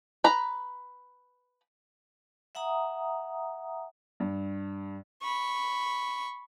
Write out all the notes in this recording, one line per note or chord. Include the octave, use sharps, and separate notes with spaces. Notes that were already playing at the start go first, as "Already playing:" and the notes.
B4 A#5
E5 F#5 G#5 A#5 D#6
G2
B5 C#6